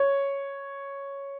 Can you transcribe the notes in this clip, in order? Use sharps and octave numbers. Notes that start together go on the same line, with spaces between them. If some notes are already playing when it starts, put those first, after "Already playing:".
Already playing: C#5